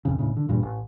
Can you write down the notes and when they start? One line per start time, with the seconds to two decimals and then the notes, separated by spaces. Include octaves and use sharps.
0.05 A#1 F2 C#3
0.19 E1 A2 C#3
0.37 D3
0.49 E2 G2 A#2
0.63 A1